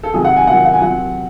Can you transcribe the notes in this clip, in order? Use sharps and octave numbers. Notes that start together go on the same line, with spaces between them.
A4
C3 D#3 F#3 G#4
F#5
G#5
C3 D#3 F#3 F#5
F#5
G#5
C3 F#3 F#5